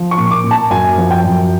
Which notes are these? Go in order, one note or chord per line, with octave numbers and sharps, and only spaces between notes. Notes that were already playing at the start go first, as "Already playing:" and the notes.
Already playing: F3
C#6
A#2
D6
A#2
A5
F#2 G#5
F3
G5
F#2